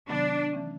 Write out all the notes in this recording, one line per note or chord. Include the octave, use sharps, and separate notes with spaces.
C3 D#3 F#3 B3 D4
E3 A3 C#4